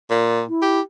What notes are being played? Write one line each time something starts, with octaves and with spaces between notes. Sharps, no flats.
A#2
E4
G4